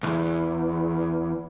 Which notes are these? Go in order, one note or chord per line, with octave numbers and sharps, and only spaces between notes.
B1 E2